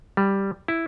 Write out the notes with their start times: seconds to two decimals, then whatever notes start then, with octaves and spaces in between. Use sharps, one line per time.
0.17 G3
0.68 E4